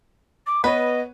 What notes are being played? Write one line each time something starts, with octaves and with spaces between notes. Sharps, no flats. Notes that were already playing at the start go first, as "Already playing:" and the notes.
D6
B3 B4 C#5 D#5